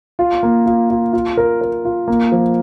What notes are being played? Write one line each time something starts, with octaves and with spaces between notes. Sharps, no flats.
F4
A#3
F4
F4
F4
A#4
A#4
F4
A#3
F3